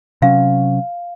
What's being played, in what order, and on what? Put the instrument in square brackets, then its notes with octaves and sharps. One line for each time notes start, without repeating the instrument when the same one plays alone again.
[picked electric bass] C3 F#3 C#4 [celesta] F5